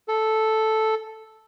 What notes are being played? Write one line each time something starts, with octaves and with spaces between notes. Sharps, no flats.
A4